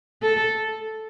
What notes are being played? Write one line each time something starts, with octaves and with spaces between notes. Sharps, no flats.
A4